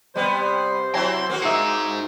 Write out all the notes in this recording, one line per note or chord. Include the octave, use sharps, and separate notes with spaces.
C3 G3 B3 C5
F#3 C4 E4 G#5 A#5 C6
A#3 C4 F#4
D#4 G#4 E5 C#7